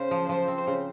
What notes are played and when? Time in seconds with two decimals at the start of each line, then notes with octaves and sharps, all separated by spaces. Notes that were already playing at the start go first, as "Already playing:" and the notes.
Already playing: C#3 C5
0.11 F3
0.29 F3 C5
0.48 C4
0.67 C#3